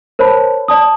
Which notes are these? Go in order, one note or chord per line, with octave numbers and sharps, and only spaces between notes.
A#4 C5 C#5 A5 B5
D5 A5 D#6